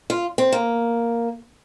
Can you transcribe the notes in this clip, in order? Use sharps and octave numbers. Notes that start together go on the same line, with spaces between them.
F4
C4
A#3